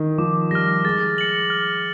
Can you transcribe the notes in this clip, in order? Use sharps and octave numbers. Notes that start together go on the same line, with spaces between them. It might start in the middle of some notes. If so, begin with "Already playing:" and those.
Already playing: D#3
F3 D6
G3 F6 A#6
G#3 A6
C#7 F#7
F6